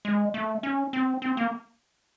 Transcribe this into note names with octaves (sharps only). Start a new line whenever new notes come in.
G#3
A3
C#4
C4
C4
A#3